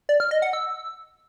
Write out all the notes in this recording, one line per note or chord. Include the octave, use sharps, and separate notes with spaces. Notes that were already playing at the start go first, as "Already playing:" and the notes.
D5
F6
D#5
F#5
E6